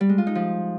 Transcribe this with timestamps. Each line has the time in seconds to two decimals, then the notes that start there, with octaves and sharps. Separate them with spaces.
0.01 G3
0.09 G#3
0.18 F4
0.27 D#4
0.35 F3